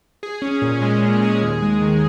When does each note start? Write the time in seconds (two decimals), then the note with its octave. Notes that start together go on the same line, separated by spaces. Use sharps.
0.23 G#4
0.42 C#4
0.62 A#2
0.82 G#3
1.03 A#2
1.22 G#4
1.42 D#2
1.62 G#3
1.81 D#3